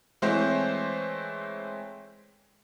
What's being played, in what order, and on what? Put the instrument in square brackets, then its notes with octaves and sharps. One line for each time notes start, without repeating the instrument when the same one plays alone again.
[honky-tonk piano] E3 G#3 A3 C4 C5 C#5